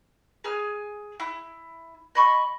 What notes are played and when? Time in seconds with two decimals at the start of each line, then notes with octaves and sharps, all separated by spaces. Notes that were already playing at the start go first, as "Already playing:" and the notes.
0.44 G#4 G#5 F6
1.20 E4
2.15 D#5 B5 C#6